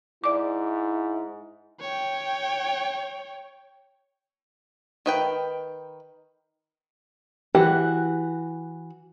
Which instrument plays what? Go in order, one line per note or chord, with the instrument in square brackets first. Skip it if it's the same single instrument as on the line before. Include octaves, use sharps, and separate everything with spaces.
[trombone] G#2 [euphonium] E4 [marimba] D5 D6
[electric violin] C#5 G5
[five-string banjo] D#3 B4 G5
[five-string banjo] E3 F#4 [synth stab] G4